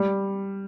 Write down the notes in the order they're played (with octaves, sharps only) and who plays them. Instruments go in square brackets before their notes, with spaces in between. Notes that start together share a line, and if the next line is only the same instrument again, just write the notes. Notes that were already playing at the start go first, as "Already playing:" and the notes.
Already playing: [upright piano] G3